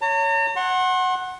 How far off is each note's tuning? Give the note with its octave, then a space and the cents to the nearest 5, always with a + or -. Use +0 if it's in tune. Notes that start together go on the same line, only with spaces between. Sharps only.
C#5 +10 A#5 -45
F#5 +0 C6 +40